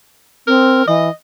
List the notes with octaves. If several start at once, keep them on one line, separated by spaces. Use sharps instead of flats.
C4 A#4
E3 D#5